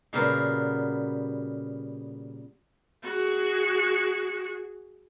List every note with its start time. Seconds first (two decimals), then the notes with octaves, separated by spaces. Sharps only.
0.13 A#2 C#3 G3 B3 F#4 A#4
3.04 F#4 G#4